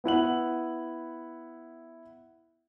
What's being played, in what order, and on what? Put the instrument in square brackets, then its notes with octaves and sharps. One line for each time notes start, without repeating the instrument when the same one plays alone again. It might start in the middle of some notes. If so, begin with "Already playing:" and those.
[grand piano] B3 E4 F#5 F#7